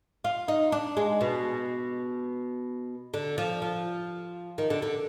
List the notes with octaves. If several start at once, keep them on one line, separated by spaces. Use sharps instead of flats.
F4
D#4
D4
G#3
B2
D3
F3
F3
D#3
D3
D3